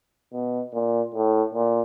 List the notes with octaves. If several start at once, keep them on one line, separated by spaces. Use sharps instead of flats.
B2
A#2
A2
A#2